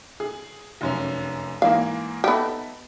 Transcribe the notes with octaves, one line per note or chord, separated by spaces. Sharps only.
G#4
F1 F#2 C#4
G#2 E3 A#3 F5
B3 D#4 G4 A4 E5